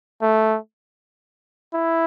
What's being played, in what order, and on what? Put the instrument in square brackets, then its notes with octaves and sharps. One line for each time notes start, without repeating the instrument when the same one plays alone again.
[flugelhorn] A3
E4